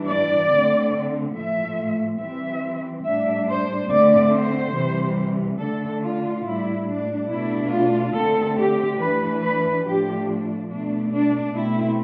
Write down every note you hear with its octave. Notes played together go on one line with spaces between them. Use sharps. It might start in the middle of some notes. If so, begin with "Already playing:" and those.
Already playing: E3 G3 D4
D5
D3 A3 C4
A2 F3 A3 E5
E3 G3 C4 E5
A2 G3 D4 E5
C5
D3 A3 C4 D5
C5
C3 E3 G3
D3 A3 D4 A4
F4
A2 G3 D4 E4
D4
B2 A3 D4 E4
F4
D3 A3 C4 A4
G4
E3 A3 D4 B4
B4
A2 F3 A3 D4 G4
B2 A3 D4
D4
B2 A3 C4 E4